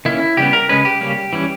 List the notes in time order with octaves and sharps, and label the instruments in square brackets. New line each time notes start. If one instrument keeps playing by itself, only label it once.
[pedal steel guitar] D#3 A#3 C#4 E4
C#3 G3 B3 G4
A#4
C#3 G#3 C#4 B4
G4
C#3 G3 A#3 C#4
E3 G3 C#4